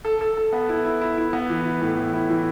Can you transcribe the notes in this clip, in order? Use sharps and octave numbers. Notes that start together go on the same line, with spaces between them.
A4
A4
A4
B3
E4
E4
E4
E4
B3
E3
E4
A2
E3
E4
E3